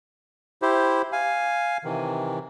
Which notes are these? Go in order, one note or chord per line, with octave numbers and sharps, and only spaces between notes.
E4 G4 C5
F5 G#5
C3 D#3 E3